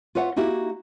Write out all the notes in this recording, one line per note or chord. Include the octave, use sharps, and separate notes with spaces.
F4 B4 C#5 E5 F#5
A#3 D#4 E4 F#4 G4